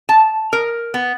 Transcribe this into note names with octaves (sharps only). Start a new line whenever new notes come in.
A5
A#4
B3